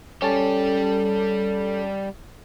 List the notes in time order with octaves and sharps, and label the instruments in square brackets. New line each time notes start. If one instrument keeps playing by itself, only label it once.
[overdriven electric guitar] G3 G4 [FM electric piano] C#4 A5 [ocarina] A4